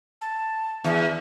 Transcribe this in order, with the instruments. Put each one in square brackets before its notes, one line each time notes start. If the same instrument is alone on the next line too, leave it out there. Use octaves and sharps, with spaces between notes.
[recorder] A5
[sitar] E2 [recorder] E5